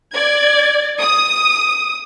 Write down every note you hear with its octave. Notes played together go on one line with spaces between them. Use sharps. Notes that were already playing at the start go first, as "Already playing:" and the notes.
D5 G#6
D#6